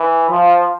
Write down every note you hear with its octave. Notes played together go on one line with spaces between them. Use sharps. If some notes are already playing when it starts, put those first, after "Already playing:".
Already playing: E3
F3